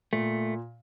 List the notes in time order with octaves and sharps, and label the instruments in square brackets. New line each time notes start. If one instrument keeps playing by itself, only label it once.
[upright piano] A#2 [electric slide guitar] A3